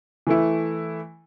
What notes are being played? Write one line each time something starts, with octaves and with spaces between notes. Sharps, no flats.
E3 A3 E4